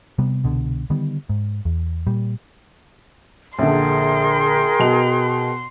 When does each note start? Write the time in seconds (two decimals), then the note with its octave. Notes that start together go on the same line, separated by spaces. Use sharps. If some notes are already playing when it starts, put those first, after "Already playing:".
0.19 C3 G3 B3
0.44 C2 B2 D3
0.90 D3 D#3 G3 B3
1.29 G#2
1.65 E2
2.07 A#2 G3
3.59 A#1 D3 G#4 A#4 G5 C6
4.80 B2 D#5 F7